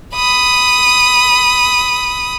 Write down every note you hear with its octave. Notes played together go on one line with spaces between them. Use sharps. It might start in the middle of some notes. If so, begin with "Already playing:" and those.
B5 D#6